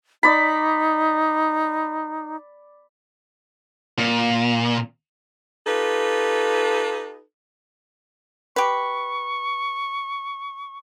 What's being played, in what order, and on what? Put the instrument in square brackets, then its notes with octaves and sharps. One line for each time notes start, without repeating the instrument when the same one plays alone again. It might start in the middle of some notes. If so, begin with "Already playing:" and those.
[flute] D#4 [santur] D5 B5
[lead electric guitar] A#2
[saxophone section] D#4 F4 G4 A4 B4
[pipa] G4 B4 [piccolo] C#6